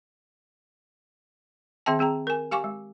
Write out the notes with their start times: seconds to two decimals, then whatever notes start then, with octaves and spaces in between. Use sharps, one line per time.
1.86 D#3 C4 G#4 E5 G5 A5
1.99 C4 G#4 G5 A#5
2.27 A#4 G#5
2.51 G4 F5 G#5 C#6 D6
2.64 G#3